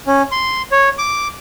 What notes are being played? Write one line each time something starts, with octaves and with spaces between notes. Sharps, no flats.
C#4
C6
C#5
D6